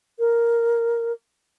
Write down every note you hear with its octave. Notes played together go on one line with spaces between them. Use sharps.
A#4